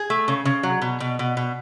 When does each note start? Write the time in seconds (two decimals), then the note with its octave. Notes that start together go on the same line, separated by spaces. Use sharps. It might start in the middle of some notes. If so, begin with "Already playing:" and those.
Already playing: G#4
0.10 A3
0.28 C#3
0.45 C#3
0.63 F#3
0.82 B2
1.00 B2
1.19 B2
1.37 B2